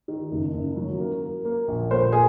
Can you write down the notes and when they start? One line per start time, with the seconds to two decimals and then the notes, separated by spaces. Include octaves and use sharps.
0.08 D#3
0.31 F#1
0.53 F#1
0.77 F#3
1.00 A#3
1.22 A#3
1.45 A#3
1.68 A#1
1.91 A#2 C5
2.12 A#3 G#4